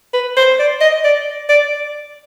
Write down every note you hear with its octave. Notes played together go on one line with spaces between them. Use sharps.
B4
C5
D5
D#5
D5
D5